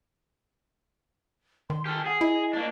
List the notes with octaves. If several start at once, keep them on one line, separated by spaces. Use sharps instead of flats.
D#3 C6
G4 A4 F6
G#4 F#5
E4 D#5
A#3 D4